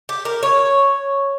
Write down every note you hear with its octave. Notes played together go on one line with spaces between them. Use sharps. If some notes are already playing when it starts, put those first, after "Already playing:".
G4
A#4
C#5